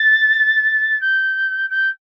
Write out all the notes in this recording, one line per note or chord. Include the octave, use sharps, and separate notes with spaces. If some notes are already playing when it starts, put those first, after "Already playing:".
Already playing: A6
G6
G6